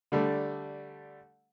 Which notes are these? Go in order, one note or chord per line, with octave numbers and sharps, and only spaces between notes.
D3 G3 A3